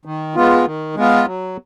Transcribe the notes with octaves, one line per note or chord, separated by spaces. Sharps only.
D#3
G#3 B3 F4
D#3
G#3 B3 F4
F#3